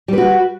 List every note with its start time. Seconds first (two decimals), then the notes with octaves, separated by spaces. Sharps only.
0.08 G3
0.13 B4
0.18 F#4